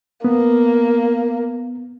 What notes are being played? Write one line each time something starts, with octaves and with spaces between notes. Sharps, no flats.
A#3 B3